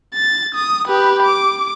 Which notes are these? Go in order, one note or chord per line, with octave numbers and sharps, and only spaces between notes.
A6
D#6
G4 B4
D6